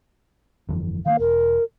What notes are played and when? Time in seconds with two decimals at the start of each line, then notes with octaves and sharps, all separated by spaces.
0.69 G1 F2 E3
1.06 D#3 G#3 A#3 F5
1.19 E1 A#4